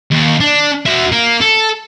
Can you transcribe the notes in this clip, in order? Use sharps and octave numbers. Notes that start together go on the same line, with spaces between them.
D#2
D4
F#4 E5
A#3 A#4
A4